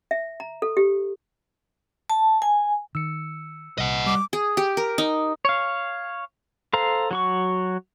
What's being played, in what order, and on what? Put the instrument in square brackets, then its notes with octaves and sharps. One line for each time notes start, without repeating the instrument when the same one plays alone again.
[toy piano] E5
A#5
A4
G4
[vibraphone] A5
G#5
[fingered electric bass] D#3 [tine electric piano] E6 C#7
[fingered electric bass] C2 [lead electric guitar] D#5 F#5
[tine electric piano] G3 [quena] D6
[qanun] G#4
G4
A#4
D#4
[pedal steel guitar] C#5 F5
A4 C5 F5 A#5
F#3 F#4 C#6